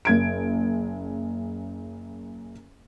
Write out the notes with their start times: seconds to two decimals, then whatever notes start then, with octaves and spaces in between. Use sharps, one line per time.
0.05 F#1 G#6 D7